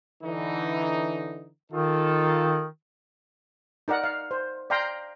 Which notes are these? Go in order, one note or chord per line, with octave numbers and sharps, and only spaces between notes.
D3 E3 D#4
D#3 D#4 F4 A4
D#4 A#4 D5 F#5
F5
C5
D5 F5 G5 A#5 C6